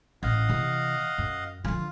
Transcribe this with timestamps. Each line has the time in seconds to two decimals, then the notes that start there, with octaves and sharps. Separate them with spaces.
0.23 A1 D#5 F5 F#5
0.49 C3 E3
1.18 F#2
1.65 D3 F3 F4